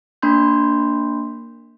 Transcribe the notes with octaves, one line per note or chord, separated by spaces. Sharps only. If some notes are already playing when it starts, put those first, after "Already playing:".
A#3 D4 B5 C6 G6